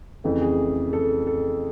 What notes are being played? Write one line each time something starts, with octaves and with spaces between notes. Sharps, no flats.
F2 C#3 E3 A3
G#4
A4
A4